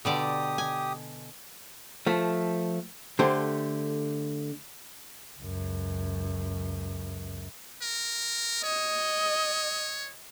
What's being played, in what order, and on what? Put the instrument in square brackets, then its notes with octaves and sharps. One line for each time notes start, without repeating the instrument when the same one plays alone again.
[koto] B2 D3 D5 [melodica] G4 D#6
[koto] G#5
[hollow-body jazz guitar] F3 A3
D3 A3 G4 C5
[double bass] C#2 F#2
[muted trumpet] A#4
[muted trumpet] C#5 [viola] D#5